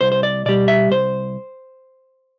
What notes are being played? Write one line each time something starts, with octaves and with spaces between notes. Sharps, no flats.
C2 C5
C5
D5
B2 G3 D5
E5
C2 C5